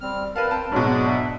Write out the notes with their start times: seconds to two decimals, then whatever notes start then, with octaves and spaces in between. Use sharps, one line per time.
0.01 G3 C4 F6
0.36 A#4 B4 F5 A5
0.51 C4 G5 A5
0.72 G#2 B2 F#3 G#3 D4
1.07 E5